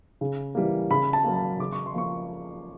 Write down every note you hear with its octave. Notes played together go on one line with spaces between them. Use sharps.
C#3
E3 G3 A#3
C#3 B5
A5
F#3 A#3
A5
C#3 D6
C#6
C6
F3 A#3 C#6